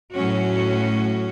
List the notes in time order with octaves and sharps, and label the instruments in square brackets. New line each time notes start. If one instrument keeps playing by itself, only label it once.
[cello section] A2 F#3 C#4 F#4